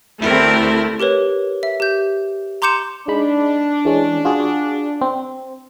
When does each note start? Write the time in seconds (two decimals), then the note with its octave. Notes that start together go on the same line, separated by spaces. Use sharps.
0.22 D2 A3 C4 E4 G4 A4 A#4
1.00 G4 A#4 B4 C#5
1.63 E5
1.80 G4 G6
2.62 A#5 C6 D6 G6 C#7 E7
3.08 G#3 D4 D#4 B5
3.85 E3 G#3 C#4
4.25 F4 F#4 G#4
5.01 C4